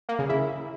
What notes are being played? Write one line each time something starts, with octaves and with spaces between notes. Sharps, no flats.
A#3
C#3
E4